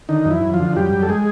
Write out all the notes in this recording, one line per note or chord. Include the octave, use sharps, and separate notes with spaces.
D3 D#3 D#4
F#2
E3 E4
F#2
F3 F4
D3
F#2 G3 G4
F#2
A4
G#3 G#4